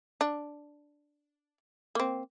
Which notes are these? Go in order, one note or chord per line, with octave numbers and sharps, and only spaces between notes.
D4
A#3 C4